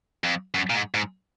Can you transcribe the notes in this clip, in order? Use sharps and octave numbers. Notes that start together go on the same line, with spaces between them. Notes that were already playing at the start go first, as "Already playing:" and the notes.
F2
F#2
A#2
G#2
G#2